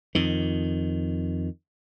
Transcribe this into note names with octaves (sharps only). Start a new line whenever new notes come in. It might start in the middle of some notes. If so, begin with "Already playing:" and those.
F2 D#3